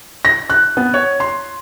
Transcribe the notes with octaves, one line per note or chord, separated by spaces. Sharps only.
A#6
F#6
B3
C#5
C6